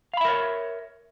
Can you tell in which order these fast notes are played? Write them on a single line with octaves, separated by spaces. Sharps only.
F5 B5 E5 A#4 C#5